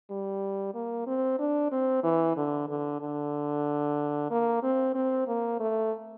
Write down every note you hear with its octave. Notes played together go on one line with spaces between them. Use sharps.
G3
A#3
C4
D4
C4
E3
D3
D3
D3
A#3
C4
C4
A#3
A3